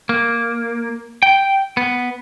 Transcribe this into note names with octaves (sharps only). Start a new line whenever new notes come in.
A#3
G5
B3